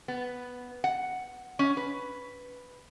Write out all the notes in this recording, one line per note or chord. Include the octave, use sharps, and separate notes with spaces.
B3
F#5
C#4
B4